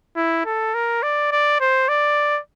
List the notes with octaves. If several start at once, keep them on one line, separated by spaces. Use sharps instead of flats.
E4
A4
A#4
D5
D5
C5
D5